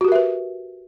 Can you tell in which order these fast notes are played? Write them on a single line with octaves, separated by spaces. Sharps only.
F#4 G4 A#4 E5 B4